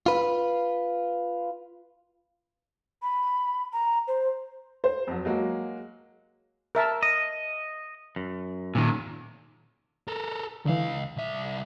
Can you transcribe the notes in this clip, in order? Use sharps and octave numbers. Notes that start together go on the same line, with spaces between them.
F4 B4
B5
A#5
C5
C5
F2 F#3
F#3 G#3 A#3 F#4
A#4 E5 A5
D#5
F#2
A#2 D#3
A4 A#4
C#2 D3 E3 F5
C2 E5